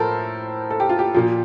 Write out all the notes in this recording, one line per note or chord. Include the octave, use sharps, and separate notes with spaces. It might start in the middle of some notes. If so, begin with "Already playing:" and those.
Already playing: A2 F3 A4 A#4 C5
A4
G4
F4
G4
A#2 F3